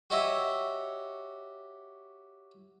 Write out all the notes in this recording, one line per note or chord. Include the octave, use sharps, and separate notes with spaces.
F#4 G4 C#5 D#5 E5